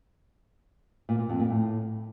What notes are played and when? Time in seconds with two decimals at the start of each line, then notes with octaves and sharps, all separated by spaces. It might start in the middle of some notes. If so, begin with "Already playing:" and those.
1.09 A#2
1.19 A#2
1.29 F2
1.40 A#2
1.50 A2